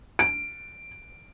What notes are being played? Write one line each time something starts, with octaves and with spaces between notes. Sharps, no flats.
D7